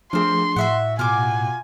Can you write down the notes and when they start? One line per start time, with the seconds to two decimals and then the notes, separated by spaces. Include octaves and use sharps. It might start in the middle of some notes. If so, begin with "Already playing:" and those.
0.13 F3 A3 A#3 C4 D4 G#4 C6
0.56 A2 F#4 E5 F#5
0.99 B2 F4 F#4 G#5 D6